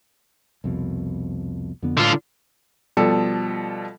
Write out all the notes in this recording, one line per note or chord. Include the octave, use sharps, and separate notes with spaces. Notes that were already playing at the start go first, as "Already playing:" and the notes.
C2 F2 B2
F2 D3 B3
A2 D3 F4
B2 F3 G3 A4